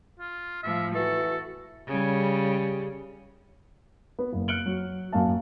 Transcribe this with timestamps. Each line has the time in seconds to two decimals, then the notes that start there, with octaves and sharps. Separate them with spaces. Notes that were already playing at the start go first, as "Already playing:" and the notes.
0.20 F4
0.63 A2 F3 E5
0.95 E3 F#4 A4
1.88 C#3 G3
4.19 B3
4.32 F#1
4.48 F6 F#6 C#7 D7 F#7 G7
4.66 F#3
5.12 F#2 A#3 F#4 F5 A5